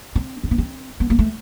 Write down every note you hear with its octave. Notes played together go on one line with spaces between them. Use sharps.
C4
C4
B3
C4
B3
A#3
A3